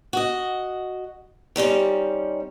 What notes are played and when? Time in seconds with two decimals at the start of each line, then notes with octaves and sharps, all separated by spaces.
0.13 F#4 D#5
1.56 D#3 G3 C4 C#4